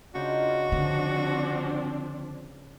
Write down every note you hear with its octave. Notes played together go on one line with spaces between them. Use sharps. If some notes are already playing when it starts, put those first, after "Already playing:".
C#3 D4 D#4 F4 F#4 G5
D3 F3 C4 D4